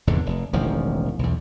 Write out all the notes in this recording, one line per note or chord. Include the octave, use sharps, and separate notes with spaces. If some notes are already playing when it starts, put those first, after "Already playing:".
F1 E2 G#2 D3
F1
E1 A1 D#3 F3
B1 E2